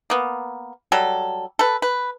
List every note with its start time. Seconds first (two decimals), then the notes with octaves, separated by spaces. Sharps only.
0.10 A#3 B3
0.92 F#3 G3 A4
1.59 A4 B4
1.82 B4